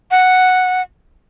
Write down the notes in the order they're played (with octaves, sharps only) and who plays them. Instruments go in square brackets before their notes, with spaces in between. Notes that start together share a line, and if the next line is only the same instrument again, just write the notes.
[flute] F#5